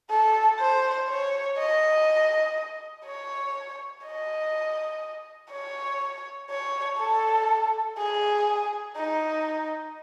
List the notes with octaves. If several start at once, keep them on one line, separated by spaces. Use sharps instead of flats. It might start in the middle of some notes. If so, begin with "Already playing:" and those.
A4
C5
C#5
D#5
C#5
D#5
C#5
C#5
A4
G#4
D#4